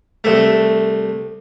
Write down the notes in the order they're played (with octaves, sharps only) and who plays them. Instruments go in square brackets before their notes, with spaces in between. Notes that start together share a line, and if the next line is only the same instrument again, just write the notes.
[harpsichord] C2 A3